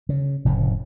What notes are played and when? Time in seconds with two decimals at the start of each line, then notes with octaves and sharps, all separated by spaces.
0.09 C#3
0.45 F1 A2 C#3